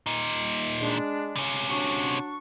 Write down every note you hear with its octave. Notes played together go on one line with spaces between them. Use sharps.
A#2 D#4
G#3 D4
C3 C#4
F#3 D4 C#6